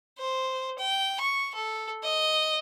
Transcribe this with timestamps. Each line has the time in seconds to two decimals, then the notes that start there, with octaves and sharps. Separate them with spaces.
0.18 C5
0.78 G5
1.20 C#6
1.54 A4
2.03 D#5